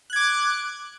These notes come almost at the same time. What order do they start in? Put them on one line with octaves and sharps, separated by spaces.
F#6 G#6 D6